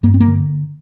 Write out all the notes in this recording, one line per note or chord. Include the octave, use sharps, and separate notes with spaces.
G2 A#3
C4
A#3
D3